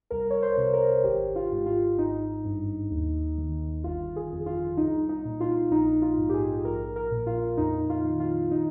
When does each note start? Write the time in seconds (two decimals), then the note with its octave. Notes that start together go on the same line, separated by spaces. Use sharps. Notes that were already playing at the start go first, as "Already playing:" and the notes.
0.11 C2 A#4
0.30 C#5
0.42 C5
0.57 C3
0.73 A#4
1.04 G#1 G4
1.36 F4
1.52 G#2
1.66 F4
1.98 G#1 D#4
2.45 G2
2.91 D#2
3.38 D#3
3.84 G1 F4
4.16 G#4
4.32 F2
4.46 F4
4.77 C2 D#4
5.09 D#4
5.25 A#2
5.40 F4
5.71 A#1 D#4
6.02 F4
6.18 G#2
6.29 G4
6.34 G#4
6.65 A#1 A#4
6.96 A#4
7.11 A#2
7.27 F4
7.57 F2 D#4
7.90 F4
8.04 D#3
8.20 F4
8.51 D#4